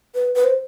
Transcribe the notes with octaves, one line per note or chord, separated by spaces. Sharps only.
B4
B4
C5